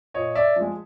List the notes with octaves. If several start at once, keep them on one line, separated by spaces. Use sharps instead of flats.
A#2 C#5 D#5
D5 E5
F3 G#3